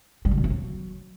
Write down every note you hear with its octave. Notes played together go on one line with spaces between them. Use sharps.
G3
C3
B2
E3
F#3